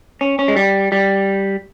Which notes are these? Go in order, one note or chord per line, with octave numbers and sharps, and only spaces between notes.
C#4
C#4
G#3
G3
G3